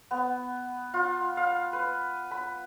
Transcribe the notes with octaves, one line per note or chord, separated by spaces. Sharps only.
B3
F4
F5
B4
B5